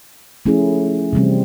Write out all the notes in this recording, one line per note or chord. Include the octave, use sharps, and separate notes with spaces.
F3 A3 C#4 E4 G#4
C3 E3 G3 C4